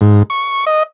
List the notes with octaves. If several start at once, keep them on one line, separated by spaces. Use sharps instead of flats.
G#2
C#6
D#5